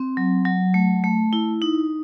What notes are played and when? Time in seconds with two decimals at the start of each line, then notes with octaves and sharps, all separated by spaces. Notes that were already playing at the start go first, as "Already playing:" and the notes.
Already playing: C4
0.17 F#3
0.45 F#3
0.74 A3
1.04 A3
1.33 E4
1.62 D#4